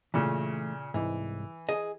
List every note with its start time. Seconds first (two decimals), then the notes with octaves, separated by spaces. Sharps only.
0.14 A#2 C#3 E3 A3
0.94 C2 G#2 E3
1.69 G#4 D#5